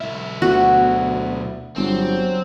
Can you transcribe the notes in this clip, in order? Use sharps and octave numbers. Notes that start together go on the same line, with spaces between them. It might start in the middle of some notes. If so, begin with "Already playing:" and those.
B1 E4
D2 B3 F#4
G1 F#3 C4